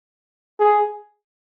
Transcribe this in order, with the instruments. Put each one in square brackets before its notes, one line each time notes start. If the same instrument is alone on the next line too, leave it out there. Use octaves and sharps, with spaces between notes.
[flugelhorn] G#4